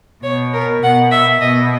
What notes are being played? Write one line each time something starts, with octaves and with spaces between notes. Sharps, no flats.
B2 C#5
A#4
B2 F#5
E5
B2 D#5